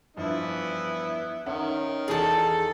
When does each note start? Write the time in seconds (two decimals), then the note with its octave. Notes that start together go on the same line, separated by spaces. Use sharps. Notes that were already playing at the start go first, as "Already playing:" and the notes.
0.17 G2 F3 B3 E4
1.46 D#3 C#4 E5 F#5
2.08 E2 G#4 A4 A5